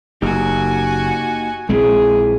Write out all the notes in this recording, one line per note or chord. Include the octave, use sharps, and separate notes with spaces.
F#1 A#3 D#4 F#4 G4 G#5
A#1 G#3 C4 E4 G#4